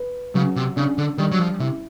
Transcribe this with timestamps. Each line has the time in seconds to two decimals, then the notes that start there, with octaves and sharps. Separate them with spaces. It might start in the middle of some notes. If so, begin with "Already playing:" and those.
Already playing: B4
0.35 C#3 F#3
0.56 C3
0.77 C#3 D4
0.98 D3
1.18 D#3 G3
1.32 F#3
1.39 F3
1.60 C3 E4